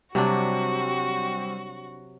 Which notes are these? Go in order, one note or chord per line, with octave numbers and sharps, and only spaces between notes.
C3 F#3 G3 C4 D4 F#4